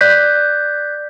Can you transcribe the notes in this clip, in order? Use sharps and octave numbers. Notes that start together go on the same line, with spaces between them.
D5 F#6 G6 B6